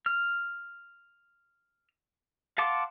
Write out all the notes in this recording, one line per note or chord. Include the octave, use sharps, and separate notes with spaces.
F6
F5 F#5 A5 C6 D6